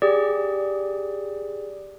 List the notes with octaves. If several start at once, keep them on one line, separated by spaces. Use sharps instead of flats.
G4 G#4 D5